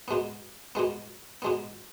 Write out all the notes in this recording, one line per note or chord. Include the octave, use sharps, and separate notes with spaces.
B2 G#3 B3
B2 G#3 B3
B2 G#3 B3